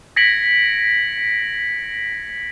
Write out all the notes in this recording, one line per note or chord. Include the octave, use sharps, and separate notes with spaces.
G#6 A#6 B6 C#7 D7 F#7